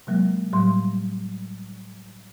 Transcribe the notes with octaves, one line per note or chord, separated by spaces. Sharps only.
C3 F#3 G#3 A#3
A2 F#3 G3 C6